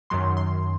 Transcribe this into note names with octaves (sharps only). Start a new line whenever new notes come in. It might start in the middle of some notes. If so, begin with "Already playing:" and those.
F#2 D#3 F#3 C6
C6